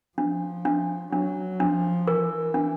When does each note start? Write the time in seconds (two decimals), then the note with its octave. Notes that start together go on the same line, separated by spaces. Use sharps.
0.18 F3 D4
0.65 D4
1.13 F#3 D4
1.60 F3 D4
2.07 E3 A#4
2.54 D4